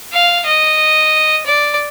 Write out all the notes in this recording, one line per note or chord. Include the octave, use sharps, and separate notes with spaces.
F5
D#5
D5